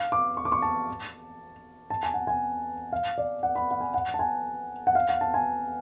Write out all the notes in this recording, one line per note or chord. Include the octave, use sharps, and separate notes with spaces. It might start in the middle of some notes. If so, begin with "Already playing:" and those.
Already playing: F5
D6
C#6
D6
C#6
A5
A5
G#5
F#5
G#5
F5
D5
F#5
B5
F#5
G#5
F#5
A5
G#5
F#5
F5
F#5
A5
G#5